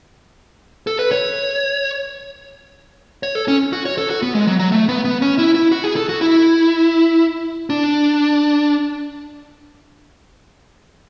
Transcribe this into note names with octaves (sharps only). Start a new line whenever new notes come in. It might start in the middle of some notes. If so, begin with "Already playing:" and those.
A4
B4
C#5
C#5
A4
C#4
F#4
C#5
A4
F#4
B3
G#3
F#3
F#3
A3
B3
B3
C#4
E4
E4
F#4
G#4
A4
F#4
E4
D4